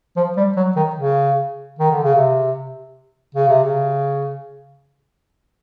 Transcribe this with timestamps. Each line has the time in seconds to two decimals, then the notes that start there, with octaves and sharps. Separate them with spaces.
0.16 F3
0.37 G3
0.56 F#3
0.76 D#3
0.96 C#3
1.79 D#3
1.91 D3
2.03 C#3
2.15 C3
3.35 C#3
3.48 C3
3.63 C#3